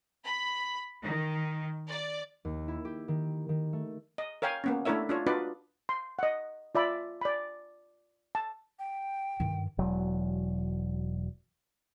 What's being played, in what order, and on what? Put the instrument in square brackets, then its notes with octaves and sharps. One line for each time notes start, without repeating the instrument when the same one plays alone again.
[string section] B5
D#3
D5
[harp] D#2
E4
G4
D#3
D#3
A3
[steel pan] D#5
A#4 C#5 F5 G5 G#5
A#3 B3 C#4
A3 D4 E4 A#4 C#5 E5
D4 F4 C#5
D4 D#4 F4 F#4 B4 D5
C6
D#5 F#5
F4 D5 E5 B5
D5 B5
A5
[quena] G5
[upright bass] G2 D#3
[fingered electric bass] E1 F#3